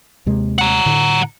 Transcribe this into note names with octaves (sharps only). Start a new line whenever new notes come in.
D#2 C3 G#3
F#5 A#5
A2 D3